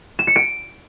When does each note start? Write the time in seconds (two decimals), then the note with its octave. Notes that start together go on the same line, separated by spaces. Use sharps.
0.19 E7
0.27 C#7
0.36 D7